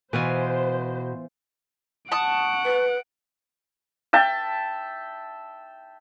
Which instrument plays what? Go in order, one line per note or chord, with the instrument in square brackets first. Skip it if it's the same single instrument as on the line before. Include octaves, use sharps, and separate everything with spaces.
[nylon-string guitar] B2 [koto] E3 F4 G#5 [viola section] C5
[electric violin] F#5 D7 [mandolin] A5 C#6 D#6
[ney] B4
[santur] E5 G5 A5